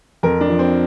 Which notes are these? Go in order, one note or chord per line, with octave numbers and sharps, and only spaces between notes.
F2 A#4
D4
F3
C4